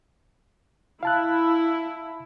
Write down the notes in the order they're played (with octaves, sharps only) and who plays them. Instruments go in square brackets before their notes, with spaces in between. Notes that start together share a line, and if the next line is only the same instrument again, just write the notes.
[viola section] E4 [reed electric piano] F5 A5 F#6